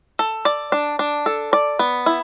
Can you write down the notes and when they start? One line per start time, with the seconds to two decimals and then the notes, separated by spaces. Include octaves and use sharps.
0.19 A4
0.45 D5
0.72 D4
0.99 D4
1.26 A4
1.53 D5
1.79 B3
2.06 E4